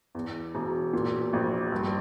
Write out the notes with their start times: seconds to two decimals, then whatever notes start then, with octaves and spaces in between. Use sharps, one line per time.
0.15 E2
0.55 E1
0.93 A#2
1.33 A#1
1.72 G2